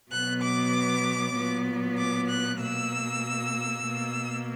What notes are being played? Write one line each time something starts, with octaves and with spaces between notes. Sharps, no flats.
B2 F#3 B3 F#6
D6
A#2 F#3 B3
D6
F#6
B2 A#3 E6
B2 A#3